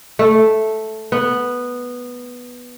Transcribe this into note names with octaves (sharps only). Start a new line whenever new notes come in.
A3
B3